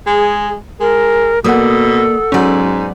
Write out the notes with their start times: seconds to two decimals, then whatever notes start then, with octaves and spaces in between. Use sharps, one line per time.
0.07 G#3 G#4
0.80 G#3 A#4
1.44 B2 A#3 A4 D5 F#5 D#6
2.32 G#2 F#3 B3 C#4 D5